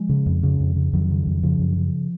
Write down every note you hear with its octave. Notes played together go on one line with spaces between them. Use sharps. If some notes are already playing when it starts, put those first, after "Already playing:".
Already playing: F3 G#3
C#3
F2
C#3
F2
C#3
F2 D#3 F#3
C#3
F2
C#3 F3
F#2
C#3